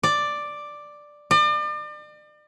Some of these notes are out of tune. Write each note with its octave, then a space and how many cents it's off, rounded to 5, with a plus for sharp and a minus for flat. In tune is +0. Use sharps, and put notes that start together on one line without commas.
D5 +5
D5 +40